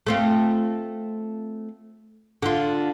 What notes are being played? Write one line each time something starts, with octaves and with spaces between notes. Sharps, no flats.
A3 C4 F4
D3 F4